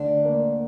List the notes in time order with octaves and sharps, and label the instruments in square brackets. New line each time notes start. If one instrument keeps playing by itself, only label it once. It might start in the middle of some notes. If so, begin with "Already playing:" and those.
Already playing: [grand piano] D2 [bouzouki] D4
[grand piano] A#3